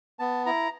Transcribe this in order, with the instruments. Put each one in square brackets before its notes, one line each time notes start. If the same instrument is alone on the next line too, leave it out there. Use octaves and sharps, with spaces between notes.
[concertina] B3 A5
E4 A#5